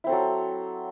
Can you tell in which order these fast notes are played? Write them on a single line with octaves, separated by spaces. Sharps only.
E4 C4 A4 F#3